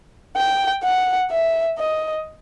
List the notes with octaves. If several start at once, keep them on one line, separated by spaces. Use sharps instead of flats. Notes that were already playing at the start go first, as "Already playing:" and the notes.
G5
F#5
E5
D#5